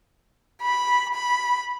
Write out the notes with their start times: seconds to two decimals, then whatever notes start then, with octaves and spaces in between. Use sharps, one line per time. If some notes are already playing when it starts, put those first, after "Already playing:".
0.63 B5
1.14 B5